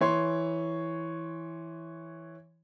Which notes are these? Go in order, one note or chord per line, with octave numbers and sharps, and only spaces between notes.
E3 C#5 C6